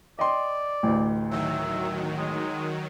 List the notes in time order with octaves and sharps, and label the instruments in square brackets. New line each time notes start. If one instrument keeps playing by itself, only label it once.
[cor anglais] D5 [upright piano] D#5 G5 C6
[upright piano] A1 D2
[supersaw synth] D#3 F#3 [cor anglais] E5
[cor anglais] G#3